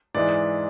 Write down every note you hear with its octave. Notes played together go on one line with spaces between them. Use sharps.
G#2 E3 G#3 D5